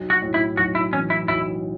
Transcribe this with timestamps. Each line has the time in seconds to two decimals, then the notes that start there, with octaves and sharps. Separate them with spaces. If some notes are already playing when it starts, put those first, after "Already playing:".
Already playing: B1
0.10 F#4
0.22 A2
0.34 E4
0.57 B1 F#4
0.75 E4
0.92 E3 C#4
1.10 E4
1.27 B1 E4